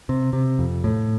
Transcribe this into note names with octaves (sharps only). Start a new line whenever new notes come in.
C3
C3
F2
A2